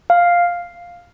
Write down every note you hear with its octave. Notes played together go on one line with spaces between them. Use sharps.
F5